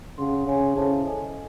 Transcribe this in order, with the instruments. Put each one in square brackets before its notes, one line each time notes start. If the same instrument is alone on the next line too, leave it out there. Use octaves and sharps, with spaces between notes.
[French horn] C#3 [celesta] C#5 F#5 C6
[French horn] C#3 [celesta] C#5 G#5 C6
[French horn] C#3 [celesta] E4 A4 C5 E5 A5
[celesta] A4 D#5 G#5